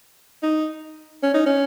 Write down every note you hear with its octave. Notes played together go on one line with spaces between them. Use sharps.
D#4
C#4
D#4
C#4